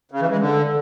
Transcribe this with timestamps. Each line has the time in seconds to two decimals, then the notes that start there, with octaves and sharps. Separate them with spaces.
0.12 C#3
0.21 E3
0.30 G#3
0.40 D3